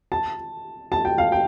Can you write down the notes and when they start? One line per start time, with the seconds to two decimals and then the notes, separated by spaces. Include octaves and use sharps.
0.12 A5
0.92 A5
1.05 G5
1.18 F5
1.32 G5